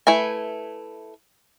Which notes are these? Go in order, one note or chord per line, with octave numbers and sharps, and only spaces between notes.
A3 E4 B4 G#5